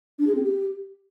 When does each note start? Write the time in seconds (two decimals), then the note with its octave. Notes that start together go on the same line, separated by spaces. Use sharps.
0.19 D4
0.27 G#4
0.35 C4
0.43 G4